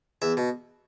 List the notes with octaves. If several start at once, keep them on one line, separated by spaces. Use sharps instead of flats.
E2 E5
B2